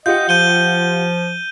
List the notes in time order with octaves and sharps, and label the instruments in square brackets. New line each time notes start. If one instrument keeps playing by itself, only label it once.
[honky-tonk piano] F4 G4 F#5 [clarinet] D#5 [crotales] G6
[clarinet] F3 [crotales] G6 D#7 G7